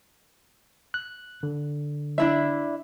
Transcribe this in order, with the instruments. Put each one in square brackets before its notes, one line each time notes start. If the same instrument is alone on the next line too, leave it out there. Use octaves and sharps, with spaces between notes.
[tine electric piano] F#6
D3
[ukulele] D4 E4 E5